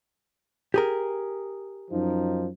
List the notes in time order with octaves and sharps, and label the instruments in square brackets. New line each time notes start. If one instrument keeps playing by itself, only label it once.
[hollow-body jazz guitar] G4 G#4 A#4
[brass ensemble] F#2 F3 D#4